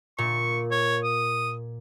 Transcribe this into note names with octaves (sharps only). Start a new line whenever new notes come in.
A#2 C#6
C#5
D#6